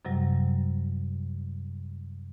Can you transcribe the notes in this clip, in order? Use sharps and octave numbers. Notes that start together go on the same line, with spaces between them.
F#2 C3 F#3 G3